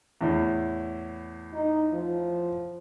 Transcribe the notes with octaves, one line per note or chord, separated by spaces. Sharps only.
E2 A2
D#4
F3